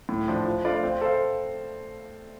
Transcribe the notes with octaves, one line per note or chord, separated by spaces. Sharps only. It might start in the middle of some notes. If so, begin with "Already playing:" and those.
A2
F3 D4
F3
A3 D4 F4 D5
C4
A4 C5 F5